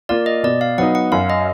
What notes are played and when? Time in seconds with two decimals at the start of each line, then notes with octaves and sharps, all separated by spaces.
0.09 A#3 F4 D5
0.26 D#5
0.43 B2 D5
0.61 F5
0.78 F#3 B3 D#4 F#5
0.95 F#5
1.12 F#2 F5
1.30 D#5